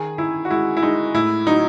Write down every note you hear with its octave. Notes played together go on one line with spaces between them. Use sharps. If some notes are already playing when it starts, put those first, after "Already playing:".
Already playing: D#3 G#4
D#3 E4
F#4
G#3 E4
E4
G#3 D#4
A2 E4
F#3 D#4